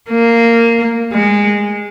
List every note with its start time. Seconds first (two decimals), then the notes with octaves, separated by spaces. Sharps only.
0.10 A#3
1.12 G#3